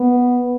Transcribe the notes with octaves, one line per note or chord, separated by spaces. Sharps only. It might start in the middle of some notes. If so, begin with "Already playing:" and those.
Already playing: B3